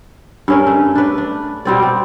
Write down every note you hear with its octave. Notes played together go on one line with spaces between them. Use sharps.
G2 C#4 A#4
A3
D4 B4
D4
B2 G3 C4 D5
C4